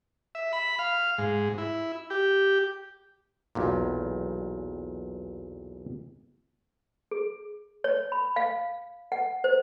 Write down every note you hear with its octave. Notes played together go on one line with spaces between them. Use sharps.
E5
B5
F5
G#2
E4
G4
B1 E2 A#2
G#4
C#5
B5
F5
F#5
C5